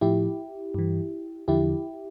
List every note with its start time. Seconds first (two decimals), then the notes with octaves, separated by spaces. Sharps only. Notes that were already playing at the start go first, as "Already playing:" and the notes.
0.01 A2 F3 E4 G4
0.74 G2 E3
1.48 E2 D3 F3 E4 G4